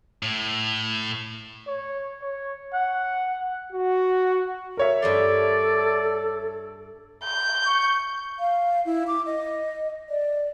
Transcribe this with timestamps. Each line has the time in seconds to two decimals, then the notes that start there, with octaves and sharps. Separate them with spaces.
0.23 A2
1.67 C#5
2.22 C#5
2.74 F#5
3.72 F#4
4.77 A#4 C#5 E5
5.02 G2 D4 A4 D5 C6
7.23 G6
7.66 C#6
8.39 F5
8.85 E4
9.07 D6
9.26 D#5
10.09 D5